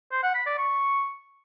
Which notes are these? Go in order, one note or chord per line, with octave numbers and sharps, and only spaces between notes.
C5
F#5
B5
D5
C#6